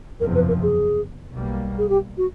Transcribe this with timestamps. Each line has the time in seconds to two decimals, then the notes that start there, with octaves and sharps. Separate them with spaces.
0.19 F#1 E2 C3 F3 A#4
0.34 B4
0.48 A#4
0.62 G#4
1.32 B1 B2 G3 A#3
1.78 G#4
1.89 G4
2.17 F#4